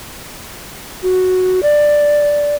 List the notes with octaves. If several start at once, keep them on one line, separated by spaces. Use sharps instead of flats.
F#4
D5